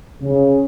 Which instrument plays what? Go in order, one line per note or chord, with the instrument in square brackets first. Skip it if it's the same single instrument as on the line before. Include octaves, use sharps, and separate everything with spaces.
[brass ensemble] C#3